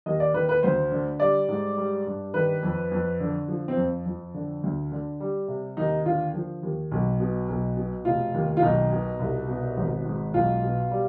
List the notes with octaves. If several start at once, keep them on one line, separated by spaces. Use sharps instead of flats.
D#2 D#5
D5
D#3 B4
B4
D2 C5
D3
G3 D5
G#2
G3
G2
D#3 B4
F2
F2
D3
F3
C4
F2
F2
D3
D2
D3
G3
C3
D#2 D#4
D3 F4
F3
D#2
B1
B2
B1
B2
F1 F4
D#2
F4
B1 D#4
B2
C2
B2
G#1
G#2
B1 F4
B2
G3